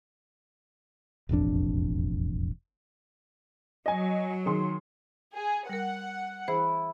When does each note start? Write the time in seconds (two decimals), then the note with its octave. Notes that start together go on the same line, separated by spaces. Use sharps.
1.29 E1 A1 F2 D4
3.86 F#3 D#5 G#5
4.46 D#3 G#4 C6
5.35 G#4
5.69 G3 A#4 F#5
6.48 E3 E4 G#4 C5